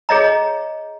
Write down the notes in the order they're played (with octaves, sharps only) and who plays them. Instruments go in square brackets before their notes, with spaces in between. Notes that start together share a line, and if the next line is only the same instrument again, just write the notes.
[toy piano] G#4 C#5 D#5 A#5